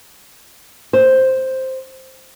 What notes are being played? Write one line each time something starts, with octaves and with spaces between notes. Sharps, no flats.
C5